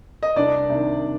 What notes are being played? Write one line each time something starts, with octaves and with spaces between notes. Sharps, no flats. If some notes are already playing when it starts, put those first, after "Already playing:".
D#5
C2 D4 D5
C3 D#3